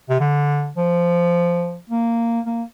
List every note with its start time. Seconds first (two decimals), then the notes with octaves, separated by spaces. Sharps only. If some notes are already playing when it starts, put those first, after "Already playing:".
0.10 C3
0.20 D3
0.77 F3
1.90 A#3
2.46 A#3